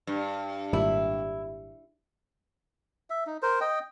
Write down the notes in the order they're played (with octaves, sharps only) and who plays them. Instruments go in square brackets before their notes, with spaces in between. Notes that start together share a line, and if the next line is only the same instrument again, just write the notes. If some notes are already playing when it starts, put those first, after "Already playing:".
[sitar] G2
[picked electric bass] G#1 A#2 G3 [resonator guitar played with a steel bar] E4
[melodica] E5
D#4
A#4 C5
D#5 G5